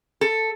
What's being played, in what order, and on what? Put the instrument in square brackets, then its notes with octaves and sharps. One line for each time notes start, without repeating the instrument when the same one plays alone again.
[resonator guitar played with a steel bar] A4